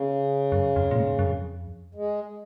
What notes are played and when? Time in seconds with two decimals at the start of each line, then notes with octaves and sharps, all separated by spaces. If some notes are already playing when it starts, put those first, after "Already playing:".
Already playing: C#3
0.52 F#2
0.76 F2
0.91 A#2
0.99 G#2
1.19 F#2
1.24 F2
1.95 G#3